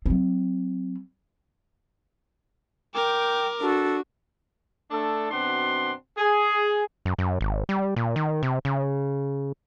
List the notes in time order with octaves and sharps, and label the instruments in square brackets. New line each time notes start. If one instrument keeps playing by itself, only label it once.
[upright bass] F#3 C4
[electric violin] A#4 D6 [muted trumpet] G5
[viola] D4 F#4 [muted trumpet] A4
[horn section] A3 D4 A4
F#2 B2 C4 D4 F#5 C6
G#4
[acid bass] F#2
F#2
G#1
G3
A#2
D#3
C3
C#3